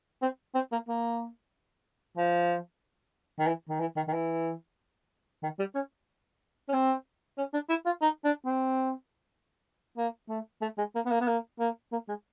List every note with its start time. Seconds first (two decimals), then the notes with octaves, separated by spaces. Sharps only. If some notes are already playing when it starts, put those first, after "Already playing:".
0.22 C4
0.55 C4
0.72 A#3
0.88 A#3
2.17 F3
3.39 D#3
3.47 E3
3.69 D#3
3.80 E3
3.96 D#3
4.08 D#3
4.13 E3
5.43 D#3
5.59 G3
5.75 C#4
6.69 C#4
6.73 C4
7.38 C#4
7.53 D4
7.69 E4
7.86 F4
8.02 D#4
8.25 D4
8.45 C4
9.97 A#3
10.29 A3
10.62 A3
10.78 G#3
10.95 A#3
11.05 B3
11.11 A#3
11.21 B3
11.28 A#3
11.59 A#3
11.92 A#3
12.08 G#3